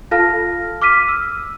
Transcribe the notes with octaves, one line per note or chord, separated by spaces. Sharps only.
F4 A4 F5 A5 F6 A#6
D6 F6 B6 D#7
E6